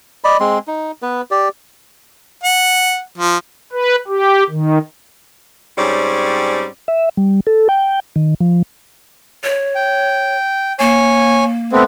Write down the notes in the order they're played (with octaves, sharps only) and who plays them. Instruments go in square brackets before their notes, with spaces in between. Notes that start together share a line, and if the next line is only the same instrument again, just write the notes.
[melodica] D5 D#5 B5
G#3 C4 C6
D#4
B3 B4
G4 D5
[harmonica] F#5
F3
[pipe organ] B4
G4
D#3
[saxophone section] G#2 G3 C4 C#4 C#5 D5
[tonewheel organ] E5
G3
A4
G5
D#3
F3
[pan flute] C#5
[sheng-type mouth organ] G5
[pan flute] A#3 [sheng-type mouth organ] C#5 G#5
[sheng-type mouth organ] A3 B3 C4